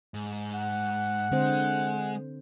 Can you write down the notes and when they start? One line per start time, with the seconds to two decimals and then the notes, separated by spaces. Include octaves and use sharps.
0.14 G#2
0.55 F#5
1.32 D3 G#3 C4 C5